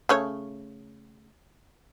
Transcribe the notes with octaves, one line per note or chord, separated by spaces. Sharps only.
C#3 A3 C#5